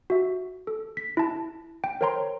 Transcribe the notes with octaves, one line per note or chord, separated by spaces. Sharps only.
F#4 E5
A4
B6
E4 A5
G5
A#4 C5 C#5 G5 A#5 C6